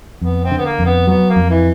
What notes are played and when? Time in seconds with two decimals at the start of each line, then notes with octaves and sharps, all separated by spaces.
0.21 F2 B3
0.44 C4
0.51 D3
0.58 B3
0.65 A#3
0.79 F2
0.86 B3
1.07 F#3 B3
1.30 A#3
1.36 F2
1.50 E3